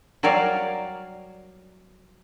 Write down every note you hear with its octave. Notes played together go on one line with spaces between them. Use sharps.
F#3 G3 A#4 C#5 D5 F5